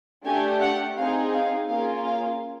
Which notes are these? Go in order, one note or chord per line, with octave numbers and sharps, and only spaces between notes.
A3 D4 G4 G#5
F#5
C4 D#4 G#4 F5
F5
A#3 C#4 F4 G#4 F5
F5